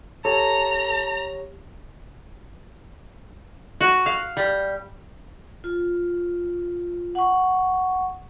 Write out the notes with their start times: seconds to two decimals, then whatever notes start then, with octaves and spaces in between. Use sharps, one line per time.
0.25 G4 A4 C#5 A#5
3.81 F#4
4.06 F5
4.37 G3
5.64 F4
7.15 F#5 C#6